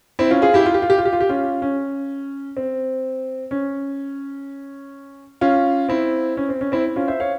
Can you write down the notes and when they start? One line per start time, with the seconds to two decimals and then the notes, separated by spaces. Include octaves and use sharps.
0.19 C4 E4
0.31 C#4 F4
0.42 F4 G#4
0.54 E4 G4
0.66 F4
0.74 G4
0.82 F4
0.90 G4
0.98 F4
1.05 G4
1.13 F4
1.21 G4
1.29 C#4 F4
1.62 C#4
2.57 C4
3.51 C#4
5.41 C#4 F4
5.89 C4 E4
6.37 C#4
6.49 C4
6.61 C#4
6.72 C4 E4
6.96 C#4 F4
7.08 C5 E5
7.20 C#5 F5